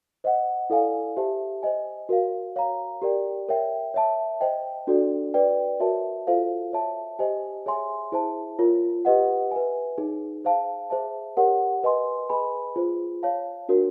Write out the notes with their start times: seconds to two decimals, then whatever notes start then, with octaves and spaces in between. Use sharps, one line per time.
0.24 C5 D#5 F#5
0.70 E4 A4 D5 F5 G#5
1.17 G4 C5 E5 A5
1.63 C5 D#5 G#5
2.09 F#4 A#4 C#5 F5
2.56 C#5 F5 A#5
3.02 G4 A#4 D5 G5
3.48 A#4 C#5 E5 G5
3.94 C#5 E5 A5
4.41 C5 D#5 G5
4.87 D4 F#4 A4 D5
5.34 B4 D5 G5
5.80 F#4 A#4 C#5 E5 A5
6.27 F4 A4 C5 F5
6.73 C#5 E5 A5
7.19 G4 C5 D#5 G#5
7.66 G#4 C#5 E5 G#5 C6
8.12 E4 G#4 C5 E5 A5
8.59 F4 A#4 C#5
9.05 G4 B4 D#5 F#5
9.51 B4 E5 G#5
9.98 D#4 G#4 C#5
10.44 G#4 C5 F5 A5
10.90 G#4 C5 E5 A5
11.37 G4 A#4 C#5 F#5
11.83 B4 D#5 G#5 C6
12.30 G#4 B4 D#5 G#5 B5
12.76 F4 G#4 C5
13.23 C#5 F5 A5
13.69 D4 F#4 A#4 C#5